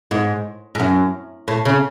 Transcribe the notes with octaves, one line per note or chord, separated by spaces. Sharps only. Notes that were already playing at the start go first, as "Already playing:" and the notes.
G#2
G#2
F#2
A2
C#3